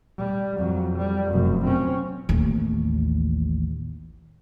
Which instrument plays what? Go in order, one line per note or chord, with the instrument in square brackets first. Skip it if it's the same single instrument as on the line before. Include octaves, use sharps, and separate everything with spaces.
[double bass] G3
F2 F#3
G3
F1 F#2
C4 C#4
[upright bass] A1 D#2